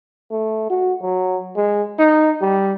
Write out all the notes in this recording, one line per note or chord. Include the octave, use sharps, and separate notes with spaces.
A3
F#4
F#3
G#3
D#4
G3